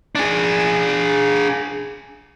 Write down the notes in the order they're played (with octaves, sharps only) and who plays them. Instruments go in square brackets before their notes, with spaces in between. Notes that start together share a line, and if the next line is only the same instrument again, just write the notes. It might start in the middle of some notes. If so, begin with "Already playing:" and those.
[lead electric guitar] D4 G#4